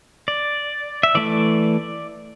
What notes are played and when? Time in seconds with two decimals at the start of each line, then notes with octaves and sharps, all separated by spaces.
0.28 D5
1.03 E5
1.15 E3 A3 D5